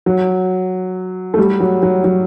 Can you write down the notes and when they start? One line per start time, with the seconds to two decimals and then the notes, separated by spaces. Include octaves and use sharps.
0.06 F#3
1.34 A3
1.38 G3
1.60 F#3
1.83 F#3
2.04 F#3